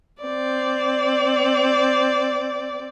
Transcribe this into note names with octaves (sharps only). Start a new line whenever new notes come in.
C4 D5